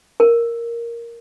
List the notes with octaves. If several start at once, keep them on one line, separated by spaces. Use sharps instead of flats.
A#4